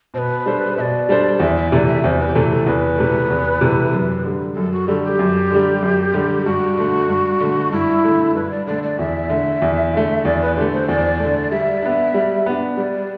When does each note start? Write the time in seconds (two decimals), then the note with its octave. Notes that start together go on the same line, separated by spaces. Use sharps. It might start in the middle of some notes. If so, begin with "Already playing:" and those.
0.14 B2 C5
0.18 B4
0.46 G3 D4 A4 C5
0.77 B2 E5
0.81 D5
1.09 G3 D4 A4 C5
1.40 E2 E5
1.56 E5
1.72 C3 E3 A3 D5
1.87 E5
2.03 E2 C5
2.20 B4
2.28 G4
2.35 C3 E3 A3 A4
2.51 A4
2.66 E2 B4
2.98 C3 E3 A3
3.30 E2
3.61 C3 E3 A3
3.93 F#2
4.25 D3 G3
4.56 F#2 A4
4.72 F#4
4.88 D3 G3 A4
5.04 G4
5.19 F#2
5.50 D3 G3
5.82 F#2
6.14 D3 G3
6.45 G2 F#4
6.77 D3 A3
7.09 G2
7.40 D3 A3
7.72 G2 E4
8.04 D3 A3
8.35 G2 B4
8.51 D5
8.67 D3 A3 D5
8.83 D5
8.99 E2 E5
9.30 D3 A3
9.62 E2
9.94 D3 A3
10.25 E2 D5
10.41 B4
10.56 D3 A3 G4
10.72 C5
10.88 E2 D5
11.20 D3 A3
11.51 G3 E5
11.82 B3 D4
12.14 G3
12.46 B3 D4
12.77 G3 D5